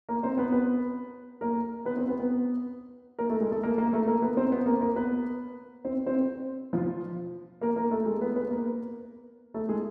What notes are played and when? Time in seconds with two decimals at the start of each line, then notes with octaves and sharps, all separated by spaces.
0.09 A#3 A#4
0.23 C4 C5
0.38 B3 B4
0.52 B3 B4
1.41 A#3 A#4
1.85 B3 B4
1.96 C4 C5
2.08 B3 B4
2.19 B3 B4
3.19 A#3 A#4
3.29 A3 A4
3.40 G#3 G#4
3.52 A3 A4
3.63 A#3 A#4
3.78 A#3 A#4
3.93 A3 A4
4.07 A#3 A#4
4.22 B3 B4
4.37 C4 C5
4.52 B3 B4
4.66 A#3 A#4
4.81 A#3 A#4
4.96 B3 B4
5.85 C4 C5
6.06 C4 C5
6.73 F3 F4
7.61 A#3 A#4
7.76 A#3 A#4
7.91 A3 A4
8.06 G#3 G#4
8.21 B3 B4
8.36 B3 B4
8.51 A#3 A#4
9.54 A3 A4
9.69 G#3 G#4